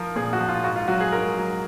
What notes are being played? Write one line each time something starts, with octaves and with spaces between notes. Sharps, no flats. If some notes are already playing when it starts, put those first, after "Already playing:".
Already playing: F3 A#4
A#2 G#4
F#4
F3
F4
G#2 F#4
F4
F#3 F#4
G#4
G#2 A#4
F#3